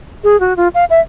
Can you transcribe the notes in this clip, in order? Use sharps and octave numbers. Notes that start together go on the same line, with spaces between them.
G#4
F#4
F4
F5
E5